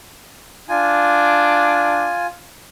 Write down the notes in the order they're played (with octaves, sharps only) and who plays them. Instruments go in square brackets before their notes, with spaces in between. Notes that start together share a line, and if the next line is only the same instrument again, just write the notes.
[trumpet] D4 [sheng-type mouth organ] F4 G#5